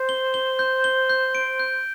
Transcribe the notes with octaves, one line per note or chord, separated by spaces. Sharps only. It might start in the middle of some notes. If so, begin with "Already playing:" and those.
Already playing: C5
G7
G7
G6
G7
G6
D7
G6